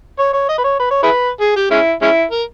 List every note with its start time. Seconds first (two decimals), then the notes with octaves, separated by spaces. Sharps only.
0.19 C#5
0.34 C#5
0.49 D#5
0.58 B4
0.64 C#5
0.80 B4
0.91 C#5
1.03 E4 G#4 B4
1.41 G#4
1.56 G4
1.71 G#3 C#4 E4
2.02 G#3 C#4 E4
2.32 A#4